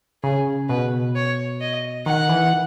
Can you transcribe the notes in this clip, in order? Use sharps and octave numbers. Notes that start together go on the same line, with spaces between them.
C#3 G#4
B2 B4
C#5
D#5
D#3 F#5
E3